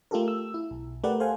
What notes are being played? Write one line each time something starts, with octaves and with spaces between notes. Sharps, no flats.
A3 F4 G4 A4 A#4
E6
E4
B1
A3 G4 A#4 B4 D5 F#5
A4 C5 F5 F#5 G#5